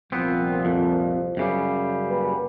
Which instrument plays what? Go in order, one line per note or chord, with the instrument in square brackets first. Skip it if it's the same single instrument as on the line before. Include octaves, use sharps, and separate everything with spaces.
[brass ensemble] C2 A#2 F3 [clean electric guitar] B3 C4
[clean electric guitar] F2
F#2 C#3 G3
[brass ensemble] A#3 G4 B4